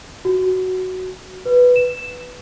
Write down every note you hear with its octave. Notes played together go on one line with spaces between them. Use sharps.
F#4
B4
E7